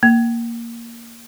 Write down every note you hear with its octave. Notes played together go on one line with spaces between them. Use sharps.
A#3